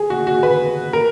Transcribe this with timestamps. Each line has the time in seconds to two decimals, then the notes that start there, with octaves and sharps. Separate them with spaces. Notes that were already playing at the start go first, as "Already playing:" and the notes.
Already playing: G#4
0.10 F#4
0.27 F#4
0.43 B4
0.93 A#4